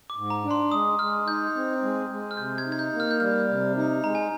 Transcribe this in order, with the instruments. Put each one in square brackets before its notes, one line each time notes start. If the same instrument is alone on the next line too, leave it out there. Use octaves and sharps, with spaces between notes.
[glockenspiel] D6
[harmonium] G#2
[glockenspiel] A#5
[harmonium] D4
[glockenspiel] C6
[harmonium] G#3 [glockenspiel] D#6
[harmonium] G#3 [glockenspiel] F6
[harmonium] D#4 [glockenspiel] G6
[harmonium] C4
G#3
G#3
[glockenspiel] F6
[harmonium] C3 [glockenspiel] G6
[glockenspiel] G#6
[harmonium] D#4
[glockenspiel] G#6
G6
[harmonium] A#3
[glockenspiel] F6
G6
[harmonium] G3 [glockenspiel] F6
[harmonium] C3
D#4
[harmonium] G#3 [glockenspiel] A#5
[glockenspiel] G#5